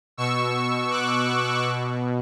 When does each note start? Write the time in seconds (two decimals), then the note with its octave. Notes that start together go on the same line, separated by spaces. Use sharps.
0.17 B2 C#6 E6
0.90 D6 F#6
1.63 B2